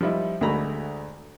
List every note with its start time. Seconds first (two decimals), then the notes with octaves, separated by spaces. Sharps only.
0.01 F3 G3 D#4 E4
0.41 D2 G#3 A3 F#4 A#5 B5